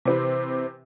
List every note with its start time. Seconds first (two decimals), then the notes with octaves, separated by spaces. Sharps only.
0.05 C3 E3 C4 G4 B4